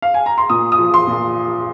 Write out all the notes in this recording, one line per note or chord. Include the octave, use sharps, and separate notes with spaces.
F5
G#5
A#5
C6
A#2 D#6
D#6
F3
C6
A#2